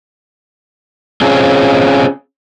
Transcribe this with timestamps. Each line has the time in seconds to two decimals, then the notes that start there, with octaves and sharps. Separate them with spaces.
1.21 C4 C#4 F4 G#4